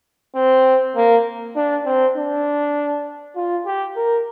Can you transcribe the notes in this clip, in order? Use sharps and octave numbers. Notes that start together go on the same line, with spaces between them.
C4
A#3
D4
C4
D4
F4
G4
A#4